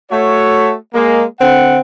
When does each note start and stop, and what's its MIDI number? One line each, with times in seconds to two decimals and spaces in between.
0.10 0.73 57
0.10 0.73 66
0.10 0.73 73
0.94 1.24 56
0.94 1.24 58
1.40 1.79 50
1.40 1.79 60
1.40 1.79 78